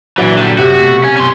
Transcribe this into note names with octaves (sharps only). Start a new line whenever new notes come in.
A#2 E3 F#3 D4 B4 D5
D3 G3
F#2 C3 F#4
B2 A3
C#4
F#2 B2 C#4 C6